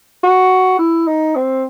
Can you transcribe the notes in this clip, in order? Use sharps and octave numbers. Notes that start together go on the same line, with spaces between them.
F#4
E4
D#4
C4